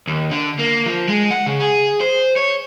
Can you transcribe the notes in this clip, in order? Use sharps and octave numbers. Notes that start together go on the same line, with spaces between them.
D#2
D3
A#3
F3
G#3
F#5
C#3
G#4
C5
C#5